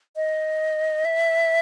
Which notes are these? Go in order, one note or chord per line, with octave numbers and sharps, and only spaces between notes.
D#5
E5